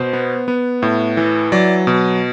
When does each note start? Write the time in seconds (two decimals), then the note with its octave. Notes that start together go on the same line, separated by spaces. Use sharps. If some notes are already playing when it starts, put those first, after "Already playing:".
Already playing: B2 C5
0.13 B3
0.48 B3
0.82 A2
1.17 E3
1.52 F#3 D5
1.87 B2